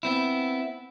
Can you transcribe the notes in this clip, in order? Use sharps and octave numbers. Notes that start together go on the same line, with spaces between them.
B3 C4 E4